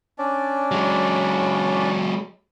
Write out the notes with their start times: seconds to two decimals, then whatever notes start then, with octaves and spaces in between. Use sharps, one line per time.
0.18 C#4 D4 D5
0.71 F#3 G#3